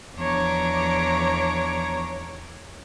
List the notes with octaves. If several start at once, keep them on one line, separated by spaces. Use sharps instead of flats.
E2 F3 D4 C#5 A#5 D6